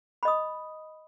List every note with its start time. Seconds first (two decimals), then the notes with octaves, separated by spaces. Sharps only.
0.23 B5
0.25 D#5
0.28 D#6